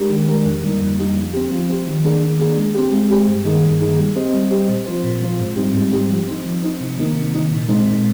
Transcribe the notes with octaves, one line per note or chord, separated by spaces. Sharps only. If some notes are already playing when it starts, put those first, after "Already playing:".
Already playing: G#3 D4 G4 A#4
D#3
G#3 D4 G4 A#4
F2
D3 G3 A#3 D#4
F2
D3 G3 A#3 D#4
F3
C4 G4
F3
C4 G4
D#3
A#3 D4 G#4
D#3
A#3 D4 G#4
G#3
C4 G4
G#3
C4 G4
G2
D#3 A#3 D#4 G#4
G2
D#3 A#3 D#4 G#4
G3
C4 G4 C5 D#5
G3
C4 G4 C5 D#5
A#2
F3 C4 F4 C5
A#2
F3 C4 F4 C5
G#2
G3 C4 D#4 G4
G#2
G3 C4 D#4 G4
F3
C4 D#4
F3
C4 D#4
C3
D#3 A#3 D#4
C3
D#3 A#3 D#4
A#2
G#3 C4 D#4
A#2